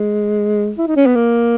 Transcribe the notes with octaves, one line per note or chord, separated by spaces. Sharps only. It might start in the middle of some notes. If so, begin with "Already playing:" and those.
Already playing: G#3
E4
D#4
C#4
B3
A#3